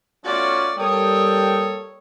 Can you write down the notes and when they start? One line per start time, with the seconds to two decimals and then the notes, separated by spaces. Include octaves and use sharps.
0.24 A3 C#4 F4 F#4 D5
0.79 G3 A#3 A4 A#4 C#5 G5 D#6